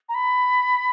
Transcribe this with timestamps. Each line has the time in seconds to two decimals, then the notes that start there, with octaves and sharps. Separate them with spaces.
0.09 A#5
0.14 B5